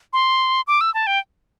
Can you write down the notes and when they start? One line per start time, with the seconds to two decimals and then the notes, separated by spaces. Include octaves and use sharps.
0.13 C6
0.67 D6
0.81 E6
0.94 A5
1.07 G5